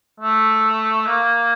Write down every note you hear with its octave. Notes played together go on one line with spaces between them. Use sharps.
A3
A#3